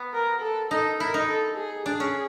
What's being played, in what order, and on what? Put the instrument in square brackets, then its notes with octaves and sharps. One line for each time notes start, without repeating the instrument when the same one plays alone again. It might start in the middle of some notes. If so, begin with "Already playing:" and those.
Already playing: [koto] B3
[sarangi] A#4
A4
[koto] D#4 [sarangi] A4
[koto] E4 [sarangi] A#4
[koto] D#4
[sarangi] A4
G#4
[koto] D4 [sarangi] G#4
[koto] C#4